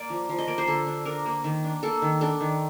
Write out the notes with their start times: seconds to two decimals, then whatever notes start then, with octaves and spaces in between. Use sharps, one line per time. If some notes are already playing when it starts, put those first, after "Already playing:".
Already playing: A#3 D5
0.10 F3
0.29 F3
0.38 D#5
0.47 A#3 D5
0.58 C5
0.67 D3 A4
0.87 D4
1.05 D4 A#4
1.25 A#3
1.44 D#3
1.64 D4
1.83 A#3 A4
2.02 D#3
2.21 D4 A4
2.40 D#3